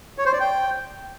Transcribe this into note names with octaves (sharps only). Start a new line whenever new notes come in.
C#5
C5
D5
G5